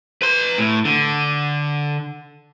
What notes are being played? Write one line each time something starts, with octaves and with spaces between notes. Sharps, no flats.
B4 C6
A2
D3